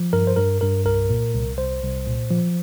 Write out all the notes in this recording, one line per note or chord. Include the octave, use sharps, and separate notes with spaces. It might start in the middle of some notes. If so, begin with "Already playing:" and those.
Already playing: F3
G2 A#4
C5
G2 A#4
G2 A#4
C2 A#4
A#2
C2
C2 C5
C2
A#2
F3